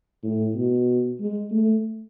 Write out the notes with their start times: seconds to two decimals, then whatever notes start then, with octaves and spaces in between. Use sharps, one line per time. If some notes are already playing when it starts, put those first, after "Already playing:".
0.24 A2
0.55 B2
1.20 G#3
1.52 A3